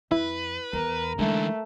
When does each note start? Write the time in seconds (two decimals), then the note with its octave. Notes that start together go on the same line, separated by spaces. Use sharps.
0.12 F2 E4 B4
0.73 E2 A#4
1.19 D3 E3 G#3 A3 D4